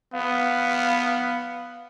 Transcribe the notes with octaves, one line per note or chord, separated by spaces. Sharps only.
B3 F5